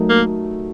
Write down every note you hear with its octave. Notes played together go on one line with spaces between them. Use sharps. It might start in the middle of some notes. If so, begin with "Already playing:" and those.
Already playing: F#3 A3 D#4 F#4 A#4
A#3